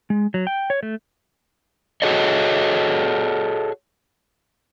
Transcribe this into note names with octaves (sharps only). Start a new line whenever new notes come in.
G#3
F#3
G5
C#5
A3
F#4 G#4 A4 C#5 D#5